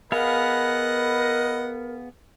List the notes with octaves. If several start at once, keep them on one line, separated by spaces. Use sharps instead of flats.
B3 G#4 A#4 B4 D#5 F5 F#5